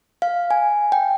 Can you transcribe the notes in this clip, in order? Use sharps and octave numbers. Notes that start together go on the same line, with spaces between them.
F5
G#5
G5